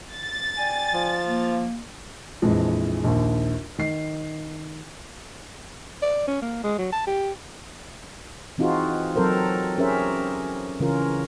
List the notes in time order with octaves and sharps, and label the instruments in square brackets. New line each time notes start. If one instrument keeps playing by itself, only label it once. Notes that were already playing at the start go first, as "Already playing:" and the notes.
[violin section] A6
[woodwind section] D5 G5 G#5
[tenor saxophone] F3
[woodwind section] A#3
[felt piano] A#1 F2 E3 F3 G#3
A#1 D#2
D#3 C7
[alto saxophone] D5
C#4
A#3
G#3
F#3
A5
G4
[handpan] E3 C4 D#4 F4 F#4 G#4
F#3 C4 A4 A#4 C5
C#4 G4 G#4 A#4 C5 E5
C#3 E3 C#4 F4 A#4